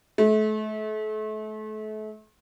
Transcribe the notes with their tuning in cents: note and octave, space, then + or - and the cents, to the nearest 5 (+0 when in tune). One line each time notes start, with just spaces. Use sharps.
A3 -35